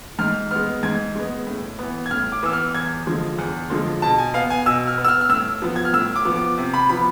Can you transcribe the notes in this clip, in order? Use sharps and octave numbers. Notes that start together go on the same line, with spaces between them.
G#2 F6
B3 F6
G#3
G#2 G#6
G#3 B3
A2
E3 B3
G#6
A2 F6
D6
E3 B3 E6
F6
E2 G#6
D3 F3 G#3
E2
D3 F3 G#3
B2 A5
G#5
B3 F5
G#5
B2 E6
F6
B3
E6
F6
F6
A2 E6
F3 B3
G#6
F6
A2 E6
D6
F3 B3
D6
C3
B5
F3 B3 B5